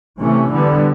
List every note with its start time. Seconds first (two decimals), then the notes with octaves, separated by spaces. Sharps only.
0.20 C3 E3 A3 C#4
0.51 D3 G3 B3